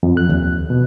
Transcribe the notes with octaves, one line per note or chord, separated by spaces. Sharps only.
F2
F#6
D#2
B2